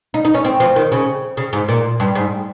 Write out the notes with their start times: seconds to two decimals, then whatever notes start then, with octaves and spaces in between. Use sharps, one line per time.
0.14 D#4
0.25 D#4
0.34 C#4
0.45 C4
0.60 F3
0.76 D#3
0.92 C#3
1.37 C#3
1.53 G#2
1.69 A#2
2.00 G2
2.15 G#2